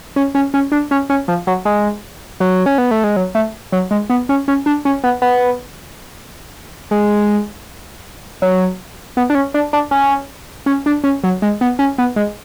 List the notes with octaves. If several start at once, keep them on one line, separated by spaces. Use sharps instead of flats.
C#4
C#4
C#4
D4
C#4
C#4
F3
F#3
G#3
F#3
C#4
B3
A3
G#3
F#3
A3
F#3
G#3
B3
C#4
C#4
D4
C#4
B3
B3
G#3
F#3
B3
D4
C#4
D4
D4
C#4
C#4
D4
C#4
F#3
G#3
B3
C#4
B3
G#3